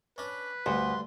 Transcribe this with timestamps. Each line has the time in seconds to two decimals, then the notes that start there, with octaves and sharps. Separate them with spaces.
0.18 C#4 D4 B4
0.66 D2 G2 C6